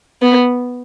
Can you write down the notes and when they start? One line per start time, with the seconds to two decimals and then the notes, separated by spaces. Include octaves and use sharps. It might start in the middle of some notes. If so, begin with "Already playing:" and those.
0.22 B3